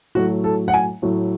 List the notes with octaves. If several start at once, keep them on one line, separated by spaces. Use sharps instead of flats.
A2 F#3 A3 F#4
A4
F#5
G#5
A2 F#3 A3